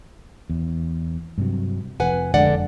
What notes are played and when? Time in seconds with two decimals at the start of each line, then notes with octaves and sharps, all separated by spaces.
0.50 E2
1.38 G2 C3 F#3
2.00 F1 F2 B4 F#5 G#5
2.34 F#1 F2 D3 G#3 D5 F#5